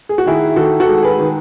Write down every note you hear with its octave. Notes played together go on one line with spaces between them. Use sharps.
G#4
F#4
D#3 E4 G#4
D#3 F#4 A4
F#4 A4
G#3
G#4 B4
D#3